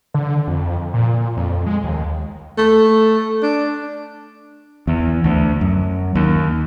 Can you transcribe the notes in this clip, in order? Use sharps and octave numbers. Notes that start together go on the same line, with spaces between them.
D3
F2
A#2
F2
G#3
D#2
A3
D4
E2
D2
F#2
D#2